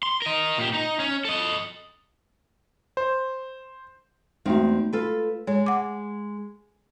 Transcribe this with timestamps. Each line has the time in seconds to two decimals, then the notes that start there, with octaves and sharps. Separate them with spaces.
0.03 C6
0.22 A#4 D#5
0.58 A#2 G4
0.74 D#4
1.00 C#4
1.25 A4 D#5
2.97 C5
4.46 E2 G#3 A3 C4 D#4 F#4
4.93 F4 A4 B4
5.47 G#3 C#5
5.66 F#5 D6